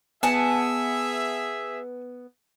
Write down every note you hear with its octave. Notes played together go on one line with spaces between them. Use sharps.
B3 G#4 E5 F#5 G#5 A5